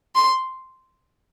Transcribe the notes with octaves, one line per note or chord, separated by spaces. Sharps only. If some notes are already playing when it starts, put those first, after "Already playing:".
C6